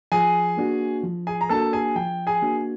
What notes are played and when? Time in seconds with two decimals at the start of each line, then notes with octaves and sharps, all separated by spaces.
0.12 F3 G#4 G#5
0.57 A#3 D4 F#4
1.04 F3
1.27 G#4 G#5
1.41 A#5
1.49 A#3 D4 F#4 A4 A5
1.73 G#4 G#5
1.96 F3 G5
2.27 G#4 G#5
2.42 A#3 D4 F#4